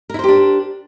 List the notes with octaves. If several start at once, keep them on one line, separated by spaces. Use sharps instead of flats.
D4 E4 G4 A#4 C5